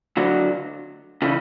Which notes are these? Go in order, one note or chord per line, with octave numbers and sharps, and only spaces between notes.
D3 F#3
C#3 E3